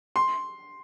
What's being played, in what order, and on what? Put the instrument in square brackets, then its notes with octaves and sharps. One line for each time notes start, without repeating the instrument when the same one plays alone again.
[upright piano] C6